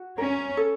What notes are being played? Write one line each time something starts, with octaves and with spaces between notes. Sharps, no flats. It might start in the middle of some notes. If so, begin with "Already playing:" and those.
Already playing: F#4
C#4 A#4
A4